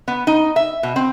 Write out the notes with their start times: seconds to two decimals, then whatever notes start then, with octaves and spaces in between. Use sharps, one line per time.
0.08 B3
0.27 D#4
0.56 E5
0.83 B2
0.96 C4